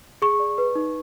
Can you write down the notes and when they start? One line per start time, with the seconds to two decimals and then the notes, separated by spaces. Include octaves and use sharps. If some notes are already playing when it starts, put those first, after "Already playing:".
0.22 G#4 C#6
0.40 D5
0.58 B4
0.75 D#4